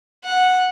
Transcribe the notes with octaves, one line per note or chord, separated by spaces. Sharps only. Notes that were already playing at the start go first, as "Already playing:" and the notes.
F#5